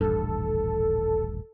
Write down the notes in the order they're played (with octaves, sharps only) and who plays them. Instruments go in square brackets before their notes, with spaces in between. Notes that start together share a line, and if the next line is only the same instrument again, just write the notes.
[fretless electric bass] D#1 A1 G2 [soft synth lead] A4